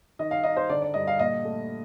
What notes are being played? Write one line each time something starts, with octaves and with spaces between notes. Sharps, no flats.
D#3 D#5
F5
D#4 D#5
C5
D3 D5
D5
G2 D#5
F5
A#2 D#5
A3